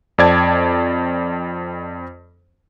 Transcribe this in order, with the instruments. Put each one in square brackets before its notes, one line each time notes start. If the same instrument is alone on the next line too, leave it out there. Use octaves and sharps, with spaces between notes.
[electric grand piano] F2 C4 D5 A5 G#6